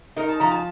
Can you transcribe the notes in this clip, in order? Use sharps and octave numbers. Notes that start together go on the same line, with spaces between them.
D#4 A#4
A5
F3 A#5
A5